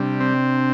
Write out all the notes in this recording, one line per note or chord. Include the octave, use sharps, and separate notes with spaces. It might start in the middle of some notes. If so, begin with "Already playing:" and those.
Already playing: C3 G3 D4
C4